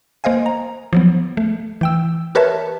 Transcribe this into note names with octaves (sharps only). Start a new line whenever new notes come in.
A#3 C5 D#5 F5 G#5
A#5
F3 F#3 B3
A3
E3 G5 E6
G4 A#4 B4 C#5 E5 A5